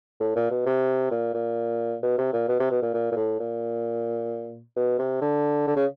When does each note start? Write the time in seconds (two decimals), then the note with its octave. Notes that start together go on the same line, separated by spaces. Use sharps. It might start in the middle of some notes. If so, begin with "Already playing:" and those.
0.20 A2
0.36 A#2
0.51 B2
0.66 C3
1.11 A#2
1.34 A#2
2.03 B2
2.18 C3
2.33 A#2
2.48 B2
2.60 C3
2.71 B2
2.82 A#2
2.94 A#2
3.12 A#2
3.16 A2
3.39 A#2
4.76 B2
4.99 C3
5.21 D3
5.67 D3
5.76 C#3